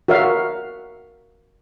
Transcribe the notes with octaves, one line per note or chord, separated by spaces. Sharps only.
F#4 A#4 C#5 E5 F5